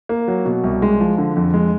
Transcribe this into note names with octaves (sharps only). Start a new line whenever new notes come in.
A#3
F#3
B2
C2
G#3
F3
D3
F2
G#3